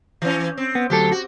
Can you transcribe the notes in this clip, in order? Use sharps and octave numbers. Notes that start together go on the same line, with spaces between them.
E3 C#4
C4
B3
D2 F#3 G4 A4
F#4